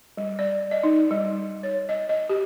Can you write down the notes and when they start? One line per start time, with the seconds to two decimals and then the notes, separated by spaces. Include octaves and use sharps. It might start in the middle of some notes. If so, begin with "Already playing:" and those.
0.17 G3
0.39 D5
0.71 D#5
0.84 D#4
1.11 G3
1.63 C#5
1.89 D#5
2.09 D#5
2.29 G4